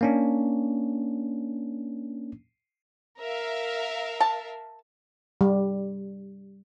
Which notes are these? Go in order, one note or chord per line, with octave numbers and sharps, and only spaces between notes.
A#3 C#4 D4
A#4 E5 F5
A5
G3